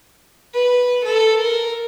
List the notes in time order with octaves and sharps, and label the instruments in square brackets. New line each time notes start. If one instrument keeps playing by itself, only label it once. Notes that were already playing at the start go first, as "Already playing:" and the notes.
[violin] B4
A4
A#4